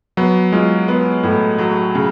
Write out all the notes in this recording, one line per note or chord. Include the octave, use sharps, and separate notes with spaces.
F#3 B3
G#3 F4
B3
A2
F#3
C#3